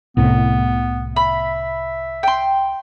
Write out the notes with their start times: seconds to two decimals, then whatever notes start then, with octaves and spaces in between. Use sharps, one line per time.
0.17 C2 A2 C3 B3
1.16 E5 B5
2.23 G5 C6